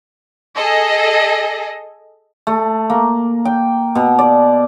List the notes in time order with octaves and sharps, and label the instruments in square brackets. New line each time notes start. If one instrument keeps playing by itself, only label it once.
[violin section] G#4 A4 D#5
[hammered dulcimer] A3
A#3
G5
B2
D5